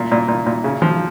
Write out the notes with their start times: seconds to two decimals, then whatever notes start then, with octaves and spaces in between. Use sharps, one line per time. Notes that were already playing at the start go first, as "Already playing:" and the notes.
Already playing: A#2
0.12 A#2
0.28 A#2
0.47 A#2
0.64 C#3
0.82 F3